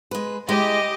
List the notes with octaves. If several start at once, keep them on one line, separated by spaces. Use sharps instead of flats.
G#3 B4
G#3 E4 G4 D#5